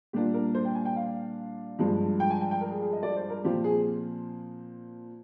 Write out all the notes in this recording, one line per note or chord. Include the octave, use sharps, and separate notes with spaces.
A#2 G3 A#3 D4 F4 G4
A#4
C5
G5
G#5
G5
F5
G2 F3 G#3
G5
G#5
G5
G5
A#4
G#4
G#4
D#5
D5
C5
A#4
A#2 F3 C4 F4 G4
G#4